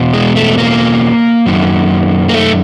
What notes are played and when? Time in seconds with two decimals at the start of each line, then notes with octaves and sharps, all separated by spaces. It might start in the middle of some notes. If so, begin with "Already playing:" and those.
Already playing: E2 B2
0.14 G#3
0.36 A3
0.58 A#3
1.46 F#2 D#3
2.29 A#3
2.34 A3